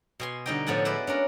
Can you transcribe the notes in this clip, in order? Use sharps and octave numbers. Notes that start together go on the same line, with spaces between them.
B2 G#5 C6
D3 G3 D#4 D#5 G5
A2 F3 B3 A4 F#5 G#5
G#3 E4 B4 D5 E5
C#4 D4 A#4